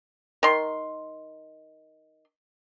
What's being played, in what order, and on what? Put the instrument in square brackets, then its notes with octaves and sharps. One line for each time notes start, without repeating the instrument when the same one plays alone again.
[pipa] D#3 C6